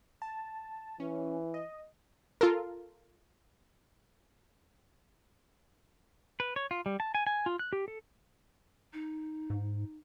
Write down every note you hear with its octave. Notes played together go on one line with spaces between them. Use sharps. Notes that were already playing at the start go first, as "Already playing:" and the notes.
A5
E3 C#4
D#5
F4 A4 A#4
B4
C#5
F4
G3
A5
G#5
G#5
F4
F#6
G4
A4
D#4
G#2